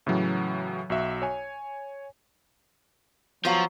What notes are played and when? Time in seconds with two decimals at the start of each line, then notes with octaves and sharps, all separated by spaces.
0.07 A2 C#3 E3 F#3
0.90 B1 F#4 E5
1.22 C#5 G#5
3.45 F3 F#3 B3 F#4 F5